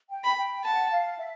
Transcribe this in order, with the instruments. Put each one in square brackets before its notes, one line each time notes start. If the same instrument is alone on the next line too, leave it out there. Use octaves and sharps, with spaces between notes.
[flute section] G5
[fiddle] B5
[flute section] G5
[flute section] F#5 [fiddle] A5
[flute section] F5
E5